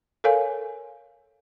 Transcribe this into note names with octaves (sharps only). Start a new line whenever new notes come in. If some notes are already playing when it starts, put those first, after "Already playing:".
A4 A#4 C#5 F5 G#5